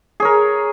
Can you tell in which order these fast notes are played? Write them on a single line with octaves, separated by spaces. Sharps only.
G#4 C#5 A#4